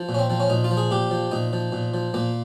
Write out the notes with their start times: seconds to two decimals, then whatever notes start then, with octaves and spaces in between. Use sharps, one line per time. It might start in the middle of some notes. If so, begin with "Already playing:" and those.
Already playing: F3
0.09 A#2
0.14 C#4
0.19 C4
0.30 F3 C4
0.40 C#4
0.50 A#2 D#4
0.64 F4
0.71 F3
0.77 G#4
0.91 A#2 G4
1.11 F3
1.31 A#2 D#4
1.53 F3
1.72 A#2
1.94 F3
2.14 A#2 A#3